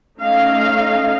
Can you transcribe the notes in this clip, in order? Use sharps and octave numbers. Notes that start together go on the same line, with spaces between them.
A3 C#4 D#4 D#5 F5